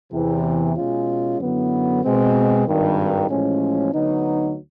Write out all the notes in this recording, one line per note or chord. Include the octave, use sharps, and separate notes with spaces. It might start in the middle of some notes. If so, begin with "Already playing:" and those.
E2 C3 E3
B2 G#3 C#4 F4
F#2 D3 F#3 B3 E4
B2 G#3 C4
G#1 G2 D#3
A1 A2 F3 G#3 C#4
D2 D3 F#3 B3 D#4